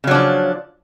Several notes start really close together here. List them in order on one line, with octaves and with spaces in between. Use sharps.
C#3 F#3 D4 F3